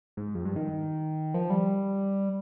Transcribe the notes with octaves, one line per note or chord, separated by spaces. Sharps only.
G#2
F2
G2
D#3
F3
G3